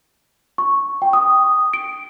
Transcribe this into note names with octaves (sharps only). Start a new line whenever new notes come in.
C#6
G5
D#6
D7